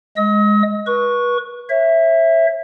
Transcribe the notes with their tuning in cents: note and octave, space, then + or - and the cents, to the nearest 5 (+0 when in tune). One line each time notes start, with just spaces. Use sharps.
G#3 +0 D#5 +10 D#6 +45
B4 -30 C#6 +0
C#5 -40 E5 +0